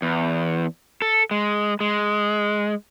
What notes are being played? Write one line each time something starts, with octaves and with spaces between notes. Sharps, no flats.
E2
A4
G#3
G#3